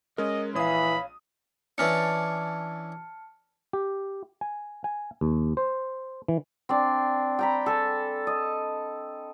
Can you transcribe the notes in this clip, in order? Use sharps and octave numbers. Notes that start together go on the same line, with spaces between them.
G#3 C#4 A#4 D#5
A#1 E3 C#5 F5 B5 D#6
E3 C#4 D4 A5 F6 C#7
G4
G#5
G#5
D#2
C5
E3
C4 D4 D5
G5 A#5 B5
A4 G#5
D#5